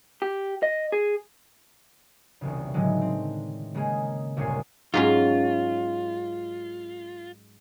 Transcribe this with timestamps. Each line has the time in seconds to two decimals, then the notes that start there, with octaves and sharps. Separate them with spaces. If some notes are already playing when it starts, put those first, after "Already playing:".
0.22 G4
0.63 D#5
0.92 G#4
2.41 E1 C2 C#3
2.74 A2 D3 D#3 F#3 G#3
3.02 C4
3.75 C#3 G#3 A#3 G#4
4.37 G1 C2 A#2 C#5 G#5 C7
4.94 G#2 F#3 C#4 F4